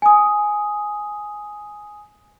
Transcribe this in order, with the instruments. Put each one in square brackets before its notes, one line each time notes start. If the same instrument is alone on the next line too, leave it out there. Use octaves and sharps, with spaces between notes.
[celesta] G#5 D#6